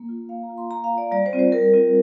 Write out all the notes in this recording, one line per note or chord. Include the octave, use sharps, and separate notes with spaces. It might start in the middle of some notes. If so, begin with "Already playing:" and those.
Already playing: A#3
F4
A#3 F5
A#5
F4
C6
A#3 A#5
F5
F4
D5
G3 D5
C5
C4 F4
C5
G3 A#4
C4 F4